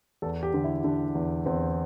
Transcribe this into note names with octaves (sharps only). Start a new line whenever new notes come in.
E2 A4
G4
D3
E4
D3 D4
E2
E2 C4